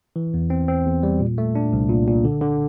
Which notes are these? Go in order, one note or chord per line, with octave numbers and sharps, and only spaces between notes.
E3
E2
C4
C4
E2
G3
A#2
A3
D4
C2
A#2
A#2
D3
D3